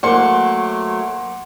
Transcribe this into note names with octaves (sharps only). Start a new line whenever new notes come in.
F#3 A3 A#3 C5 F#5 C6